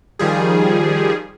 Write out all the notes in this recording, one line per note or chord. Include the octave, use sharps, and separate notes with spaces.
D#3 F3 G3 G#4